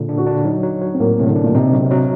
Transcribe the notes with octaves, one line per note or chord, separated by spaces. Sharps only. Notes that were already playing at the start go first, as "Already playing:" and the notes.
Already playing: A#2 D3
D4
F#4
D4
F#3 D#4
F#3
F#3
C4
A2 A#3
A2 C3
D3
D4
A#2
C3 D#4
F#3
C3
F#3